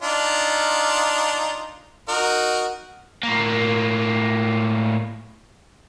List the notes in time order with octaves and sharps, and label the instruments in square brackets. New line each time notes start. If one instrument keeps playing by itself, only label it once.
[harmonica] D4 D#4 F4
D#4 F#4 A#4
[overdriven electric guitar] A2 A#3